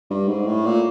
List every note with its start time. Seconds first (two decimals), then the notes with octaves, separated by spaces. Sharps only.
0.10 G2
0.28 G#2
0.46 A2
0.65 A#2